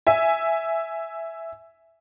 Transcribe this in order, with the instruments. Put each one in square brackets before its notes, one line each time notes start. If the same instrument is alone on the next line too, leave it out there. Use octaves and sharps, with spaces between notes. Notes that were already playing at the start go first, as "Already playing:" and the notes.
[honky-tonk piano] E5 G#5